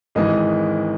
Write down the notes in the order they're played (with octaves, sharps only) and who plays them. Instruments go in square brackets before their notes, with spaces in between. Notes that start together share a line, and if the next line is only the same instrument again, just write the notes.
[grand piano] G#1 G#2 E3 D#5